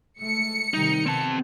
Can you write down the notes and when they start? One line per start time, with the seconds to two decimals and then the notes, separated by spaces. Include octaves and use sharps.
0.21 G#3 A3 C#7
0.74 C3 D#3 G3 D#4
1.06 C3 B3 C4 A5